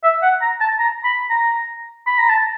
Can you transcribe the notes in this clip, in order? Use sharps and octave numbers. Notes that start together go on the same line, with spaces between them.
E5
F#5
A#5
A5
A#5
B5
A#5
B5
A#5
A5